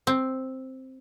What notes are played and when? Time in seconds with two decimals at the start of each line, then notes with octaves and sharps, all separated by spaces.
0.07 C4